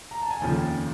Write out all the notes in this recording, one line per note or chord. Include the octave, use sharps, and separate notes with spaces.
A#5
A5
G#5
F1 D#2 C#3 F3 G5